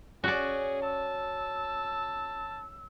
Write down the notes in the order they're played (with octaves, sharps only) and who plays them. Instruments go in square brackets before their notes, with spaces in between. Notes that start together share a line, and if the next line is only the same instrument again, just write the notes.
[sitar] C#4 [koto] F#4 D5 [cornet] G#4
[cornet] A5 [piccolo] E6